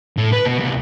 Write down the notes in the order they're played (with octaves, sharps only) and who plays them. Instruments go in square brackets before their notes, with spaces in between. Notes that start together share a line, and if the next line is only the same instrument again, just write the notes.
[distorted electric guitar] A2
B4
B2
C2